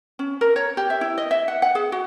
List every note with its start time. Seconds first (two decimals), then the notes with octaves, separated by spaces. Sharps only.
0.19 C#4
0.41 A#4
0.56 C#5
0.77 G4
0.90 E5
1.01 E4
1.18 D#5
1.31 E5
1.48 F#5
1.62 F#5
1.75 G#4
1.92 F#4